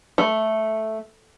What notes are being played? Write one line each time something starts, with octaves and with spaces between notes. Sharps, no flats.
A3